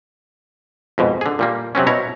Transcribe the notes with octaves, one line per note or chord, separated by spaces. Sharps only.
F2 G#2 B2
D3 G#4
A#2 G3 A#3
C3 F#3 C4 C#4
B2 E4 C#5 A#5